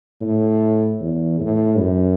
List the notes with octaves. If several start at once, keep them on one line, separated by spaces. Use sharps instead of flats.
A2
E2
A2
F#2